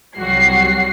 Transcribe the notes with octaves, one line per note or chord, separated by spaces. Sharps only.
C2 F#3 G3 F#4 C7